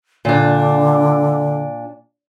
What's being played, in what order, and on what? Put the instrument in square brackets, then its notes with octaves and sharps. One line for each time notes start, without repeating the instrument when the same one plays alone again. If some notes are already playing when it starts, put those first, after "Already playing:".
[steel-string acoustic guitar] A#2 D4 [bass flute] D3